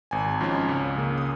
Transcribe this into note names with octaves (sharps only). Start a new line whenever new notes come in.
G#1 G#5
G#2 F3 C#4
C#2
C#3 A#3
D#6